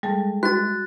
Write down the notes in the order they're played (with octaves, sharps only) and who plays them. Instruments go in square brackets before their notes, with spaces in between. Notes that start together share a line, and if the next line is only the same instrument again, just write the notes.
[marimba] G3 A4 A5 [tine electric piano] G#3
[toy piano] F#4 [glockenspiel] F#6 A6